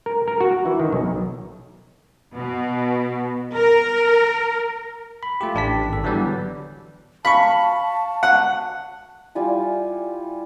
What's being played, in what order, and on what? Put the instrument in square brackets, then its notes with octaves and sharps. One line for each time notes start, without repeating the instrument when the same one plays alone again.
[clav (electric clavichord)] A#4
A#4
F#4
E3
D#3
B1
[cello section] B2
A#4
[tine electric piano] B5
A3 F4 G4
A1 D4 G4 A5 B6
G#1 A4
D3 E3 F#3 G3 B3
[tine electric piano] F5 C#6 [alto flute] A5 [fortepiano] B5
[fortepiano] F#5
[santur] G3 E4 F4 G#5